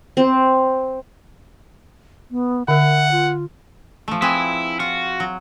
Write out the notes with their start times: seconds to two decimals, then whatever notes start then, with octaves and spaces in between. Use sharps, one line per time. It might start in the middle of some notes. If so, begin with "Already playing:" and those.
0.17 C4
2.31 B3
2.68 D3 A#4 E5 F#5
3.12 F4
4.08 F3 A3
4.22 C4 E4 G#4 B4
4.80 F4 F#4
5.20 F#3